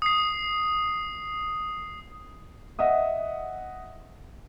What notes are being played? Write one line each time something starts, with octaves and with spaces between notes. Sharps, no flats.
D#6 C7
D#5 E5 F#5 D#6